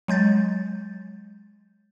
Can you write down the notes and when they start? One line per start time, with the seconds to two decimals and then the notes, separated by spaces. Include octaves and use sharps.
0.08 F#3 G#3 G6 A6